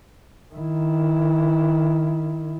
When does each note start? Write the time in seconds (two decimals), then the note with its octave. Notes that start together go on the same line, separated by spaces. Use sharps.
0.54 D#3 E4